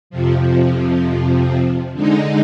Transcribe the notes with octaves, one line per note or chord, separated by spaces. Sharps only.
F2 C3 F3
D3 G#3 D#4